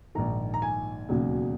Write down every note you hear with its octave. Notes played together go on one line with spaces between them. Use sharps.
A#1 G#2 D#3 A#5
A#5
G#5
E1 D#2 C#3 F#3